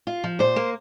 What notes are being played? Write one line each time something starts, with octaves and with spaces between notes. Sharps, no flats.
F4
F3
A#2 C5
A#3